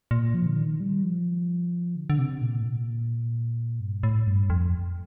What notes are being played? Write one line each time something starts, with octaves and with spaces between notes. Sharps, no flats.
A#2
F3
D3
D#3
G3
F3
D3
D3
C3
A#2
A2
A#2
G2
A2
G2
F2